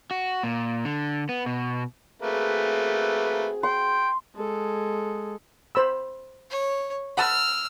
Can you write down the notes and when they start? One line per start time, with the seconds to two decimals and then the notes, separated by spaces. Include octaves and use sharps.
0.11 F#4
0.43 A#2
0.85 D3
1.29 B3
1.46 B2
2.22 A3 A#3 C4 F#4 G#4 B4
3.63 G5 C6
4.36 G#3 A4
5.75 C5 B5 E6
6.50 C#5
7.18 F#5 A5 B5 E6 F6